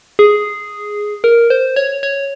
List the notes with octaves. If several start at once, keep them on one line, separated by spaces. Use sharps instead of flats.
G#4
A#4
C5
C#5
C#5